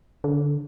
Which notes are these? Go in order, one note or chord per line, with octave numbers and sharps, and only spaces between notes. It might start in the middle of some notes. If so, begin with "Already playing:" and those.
D3